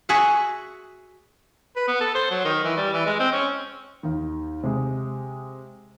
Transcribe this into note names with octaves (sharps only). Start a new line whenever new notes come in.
F#4 G#4 E5 F#5
B4
B3
A4
C5
F#3
D#3
E3
G3
E3
G#3
C4
C#4
D#2 D#3
C3 G#3